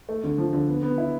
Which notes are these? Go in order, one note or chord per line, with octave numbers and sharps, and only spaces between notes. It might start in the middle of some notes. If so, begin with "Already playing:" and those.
A3
D3
F3
D3
B3
B3
E4